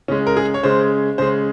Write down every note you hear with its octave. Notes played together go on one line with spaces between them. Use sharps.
C#3 G#3 C#4
A#4
G#4
C#5
C#3 G#3 C5
C#3 G#3 C5